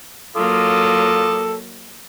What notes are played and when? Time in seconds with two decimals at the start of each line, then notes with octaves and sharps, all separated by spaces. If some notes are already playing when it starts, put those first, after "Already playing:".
0.36 F#3 A#3 F4 A4 D6 D#6